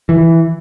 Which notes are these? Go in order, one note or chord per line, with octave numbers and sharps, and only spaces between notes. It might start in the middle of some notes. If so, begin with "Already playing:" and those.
E3